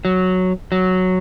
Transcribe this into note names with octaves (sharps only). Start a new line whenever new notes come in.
F#3
F#3